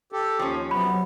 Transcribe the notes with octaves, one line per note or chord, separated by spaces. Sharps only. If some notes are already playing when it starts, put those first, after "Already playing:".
G4 A4
D#2 F3 C#4
C3 F#3 B3 B5